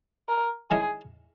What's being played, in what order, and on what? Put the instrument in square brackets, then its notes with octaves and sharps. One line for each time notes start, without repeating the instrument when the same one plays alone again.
[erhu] A#4
[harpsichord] D#3 G#3 C#4 E4 [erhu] G#4